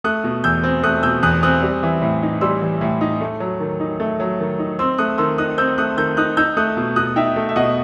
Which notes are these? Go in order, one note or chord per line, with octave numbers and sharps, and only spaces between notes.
A3 D#6 F#6
B2
E2 E6 G6
C4
A3 D#6 F#6
B2 E6 G6
E2 D#6 F#6
C4 D#6 F#6
G3
E3
A2
D#4
G3 C6 E6
E3
A2
D#4
A3
F#3
D#3
D#4
A3
F#3
D#3
D#4
C4 C6 E6
A3 D#6 F#6
D#3 C6 E6
D#4 D#6 F#6
C4 E6 G6
A3 D#6 F#6
D#3 E6 G6
D#4 D#6 F#6
D#4 E6 G6
A3 D#6 F#6
B2
B2 D#6 F#6
D#4 E5 G5
A3
E5
B2 D#5 F#5